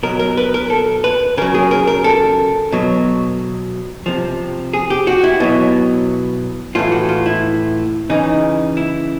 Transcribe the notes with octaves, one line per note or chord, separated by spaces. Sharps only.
B2 F#3 A#4
A#4
B4
A#4
A4
B4
C#3 F#3 A#4
G#4
A#4
A#4
A4
B2 F#3
C3 F3
G#4
G4
F#4
E4
B2 F#3
A2 E3 F4
F#4
F4
E4
C#3 E3 D#4
E4